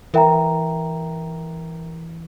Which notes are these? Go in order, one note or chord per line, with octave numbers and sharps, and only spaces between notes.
E3 A#4 E5 G5 A#5